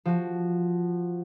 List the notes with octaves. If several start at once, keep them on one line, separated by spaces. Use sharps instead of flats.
F3 F#4